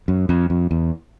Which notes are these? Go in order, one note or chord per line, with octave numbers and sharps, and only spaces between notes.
F#2
F2
F2
E2